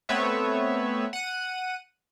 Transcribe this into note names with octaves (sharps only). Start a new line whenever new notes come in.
A3 B3 C4 B4 C#5 E5
F#5 D#7